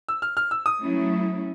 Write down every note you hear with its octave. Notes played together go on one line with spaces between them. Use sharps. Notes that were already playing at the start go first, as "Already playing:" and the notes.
E6
F6
F6
E6
D#6
F#3 A3 C#4 E4